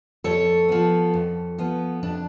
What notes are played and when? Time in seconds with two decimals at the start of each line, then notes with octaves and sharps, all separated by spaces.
0.24 F2 A4 C#5
0.68 F3 B3
1.14 F2
1.58 F3 B3
2.03 F2 D4